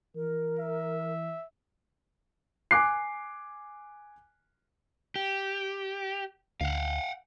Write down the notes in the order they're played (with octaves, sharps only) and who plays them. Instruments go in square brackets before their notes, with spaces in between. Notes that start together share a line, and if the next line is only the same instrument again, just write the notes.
[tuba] E3 [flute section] A#4
[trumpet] E5
[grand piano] G#5 D6 F#6 C7
[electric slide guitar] G4
[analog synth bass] D2 [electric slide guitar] F5 F#5